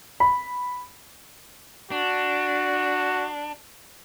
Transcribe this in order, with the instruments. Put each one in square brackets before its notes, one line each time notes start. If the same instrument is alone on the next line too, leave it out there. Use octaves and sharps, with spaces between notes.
[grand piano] B5
[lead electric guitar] D4 [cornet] F#4